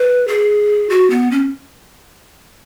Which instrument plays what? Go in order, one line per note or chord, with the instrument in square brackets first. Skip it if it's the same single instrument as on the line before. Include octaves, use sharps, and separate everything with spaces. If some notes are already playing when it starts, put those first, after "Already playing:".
Already playing: [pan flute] B4
G#4
F#4
B3
C#4